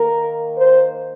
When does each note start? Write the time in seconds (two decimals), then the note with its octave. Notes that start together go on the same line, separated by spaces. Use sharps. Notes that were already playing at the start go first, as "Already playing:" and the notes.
Already playing: D#3 A#3 A#4
0.57 C5